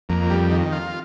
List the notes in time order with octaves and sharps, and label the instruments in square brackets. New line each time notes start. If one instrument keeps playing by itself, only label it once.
[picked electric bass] F2 [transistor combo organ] A#3
[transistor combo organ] G3
D#3
F4